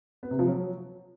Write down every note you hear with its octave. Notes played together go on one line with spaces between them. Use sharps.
B3
C3
F3
F#3